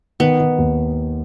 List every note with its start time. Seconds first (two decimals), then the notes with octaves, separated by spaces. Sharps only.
0.20 D#3 B3
0.40 D#3
0.58 D#2